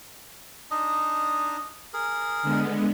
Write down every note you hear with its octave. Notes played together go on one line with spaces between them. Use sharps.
D4 D#4 D#5
G#4 A#4
D3 G#3 B3